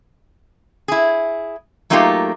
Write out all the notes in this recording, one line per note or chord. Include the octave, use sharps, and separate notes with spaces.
E4 G#4
F#3 A3 A#3 D#4 F4 G4